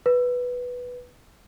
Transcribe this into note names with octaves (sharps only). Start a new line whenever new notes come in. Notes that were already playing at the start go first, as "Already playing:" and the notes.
B4